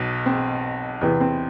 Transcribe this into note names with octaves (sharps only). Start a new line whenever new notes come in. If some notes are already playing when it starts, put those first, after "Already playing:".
Already playing: B1 B2
C4
E2 C3 E3 B3
C4